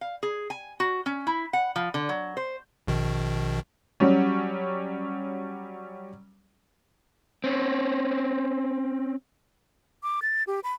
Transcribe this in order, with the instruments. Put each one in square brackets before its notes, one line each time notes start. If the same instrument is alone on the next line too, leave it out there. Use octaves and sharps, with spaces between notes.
[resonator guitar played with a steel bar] F5
G#4
G#5
F#4
C#4
E4
F#5
F3
D3
F#3
C5
[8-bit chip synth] A#1 B2 D#3
[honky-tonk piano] F#3 G3 C#4
[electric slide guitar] C4 C#4
[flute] D6
A6
G4
B5